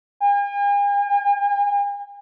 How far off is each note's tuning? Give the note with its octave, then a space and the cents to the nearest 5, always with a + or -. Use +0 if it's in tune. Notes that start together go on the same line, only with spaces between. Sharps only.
G#5 -45